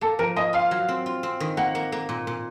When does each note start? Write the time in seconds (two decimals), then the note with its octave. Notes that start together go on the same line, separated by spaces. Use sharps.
0.01 A#3 A4
0.19 F3 A#4
0.36 A#3 D#5
0.53 F4 F5
0.71 F#3
0.89 C4
1.06 F4
1.23 C4
1.40 D#3
1.57 A#3 F#5
1.75 A#3
1.92 A#3
2.09 A#2
2.27 A#2